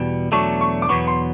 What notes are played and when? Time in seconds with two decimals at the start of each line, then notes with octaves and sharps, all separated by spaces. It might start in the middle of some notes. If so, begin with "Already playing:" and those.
Already playing: E2 B2 G3
0.32 E2 B2 F#3 A3 D4 C#6
0.61 C#6
0.82 D6
0.89 E2 B2 F#3 B3 C#6
1.07 C6